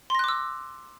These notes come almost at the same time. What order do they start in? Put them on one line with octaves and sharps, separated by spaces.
C6 A#6 F#6 D6 E6